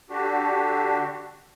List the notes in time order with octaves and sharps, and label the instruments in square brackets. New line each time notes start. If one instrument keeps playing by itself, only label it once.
[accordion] D3 D4 F#4 G4